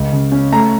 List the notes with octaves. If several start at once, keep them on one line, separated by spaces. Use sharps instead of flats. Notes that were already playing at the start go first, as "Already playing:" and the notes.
Already playing: C#2
C#3
C#4
A3 A#5